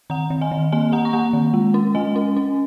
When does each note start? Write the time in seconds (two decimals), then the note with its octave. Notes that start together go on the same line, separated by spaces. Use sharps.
0.10 D#3 F#5 A#5
0.30 D#3
0.41 D#5 G#5
0.51 D#3
0.72 A#3 D#5 G#5
0.92 A#3 F#5 A#5
1.05 C#6
1.13 A#3 F#5 A#5
1.33 D#3
1.54 G#3
1.74 C#4
1.95 G#3 D#5 G#5
2.16 C#4
2.37 C#4